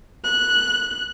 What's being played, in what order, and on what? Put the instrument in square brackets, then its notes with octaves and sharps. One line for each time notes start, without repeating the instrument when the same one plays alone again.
[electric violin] F#6